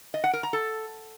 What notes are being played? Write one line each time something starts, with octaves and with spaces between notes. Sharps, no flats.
D#5
F#5
A#4
A#5
A4